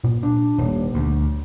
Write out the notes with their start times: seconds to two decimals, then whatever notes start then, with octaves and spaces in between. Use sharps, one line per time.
0.04 A#2
0.23 D4
0.58 D#1
0.94 D2